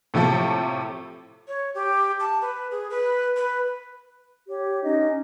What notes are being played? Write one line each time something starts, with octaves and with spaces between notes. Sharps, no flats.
A2 C3 F3 A3 A4
C#5
G4
A5
B4
G#4
B4
B4
G4 C#5
C#4 D#4 D#5